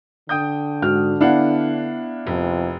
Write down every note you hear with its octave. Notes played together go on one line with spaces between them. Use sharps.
D3 G5 D#6 G6
G#2 F#4 F6
B3 D4 E4 F5 F#5
F1 F2